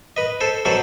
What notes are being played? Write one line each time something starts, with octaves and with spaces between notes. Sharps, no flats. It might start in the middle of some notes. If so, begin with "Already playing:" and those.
B4 D#5
A4 C5
B2 F#3 A4 C5